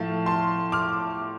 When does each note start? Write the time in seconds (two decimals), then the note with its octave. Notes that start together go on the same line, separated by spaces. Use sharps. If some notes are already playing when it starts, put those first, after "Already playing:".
Already playing: A2 F3 A3 F5 A5
0.26 A5 C6
0.72 D6 F6